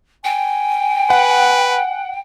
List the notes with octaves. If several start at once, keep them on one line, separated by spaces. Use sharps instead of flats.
G5 G#5
B4 F#5